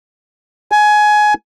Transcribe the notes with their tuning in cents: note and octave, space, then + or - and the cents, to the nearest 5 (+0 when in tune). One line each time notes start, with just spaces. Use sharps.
G#5 +20